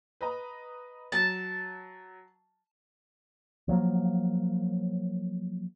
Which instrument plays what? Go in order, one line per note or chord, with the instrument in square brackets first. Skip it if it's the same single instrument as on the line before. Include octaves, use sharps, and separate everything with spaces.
[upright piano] B4 D#5 A#5
[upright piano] F#3 [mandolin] A5
[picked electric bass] F3 F#3 A#3